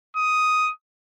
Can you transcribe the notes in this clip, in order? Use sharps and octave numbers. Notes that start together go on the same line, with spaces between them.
D#6